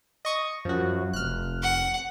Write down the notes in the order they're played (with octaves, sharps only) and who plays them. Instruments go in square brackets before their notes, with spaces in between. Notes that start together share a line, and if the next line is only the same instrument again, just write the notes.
[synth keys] D#5 C#6 D#6
[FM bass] F#2 [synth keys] F3 F#4
[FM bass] F1 [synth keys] F6 F#6
[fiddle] F#5